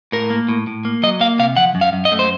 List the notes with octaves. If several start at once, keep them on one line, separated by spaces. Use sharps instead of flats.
A2 A#4
A#3
A2
A2
A#3
F#3 D#5
A#3 F5
C3 F5
F3 F#5
F#2
F5
F#2
D#5
A3
C5